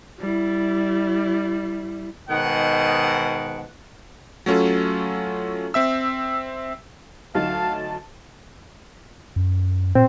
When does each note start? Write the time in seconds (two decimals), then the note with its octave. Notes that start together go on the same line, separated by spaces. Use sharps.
0.20 G3 E4
2.30 G#2 B2 D#3 F#5
4.46 F#3 A3 C#4 F4 A4
5.74 C4 E5 E6
7.35 D2 F#3 D#4 F5 A5
9.36 F#2
9.95 A#2 C4